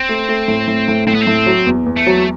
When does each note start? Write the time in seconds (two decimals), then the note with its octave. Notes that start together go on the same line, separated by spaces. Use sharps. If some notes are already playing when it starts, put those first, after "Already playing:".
Already playing: C4
0.09 A3
0.29 A3
0.48 A2
0.68 A2
0.88 A2
1.07 A2 C4
1.15 B3
1.21 C4
1.27 A2
1.46 F#3
1.66 E2
1.86 E2
1.96 A3
2.06 F#3